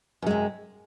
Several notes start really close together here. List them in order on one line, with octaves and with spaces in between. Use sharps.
F#2 G#3 C3